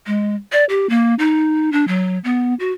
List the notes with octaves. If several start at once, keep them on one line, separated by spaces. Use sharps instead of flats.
G#3
D5
G4
A#3
D#4
D4
F#3
B3
F#4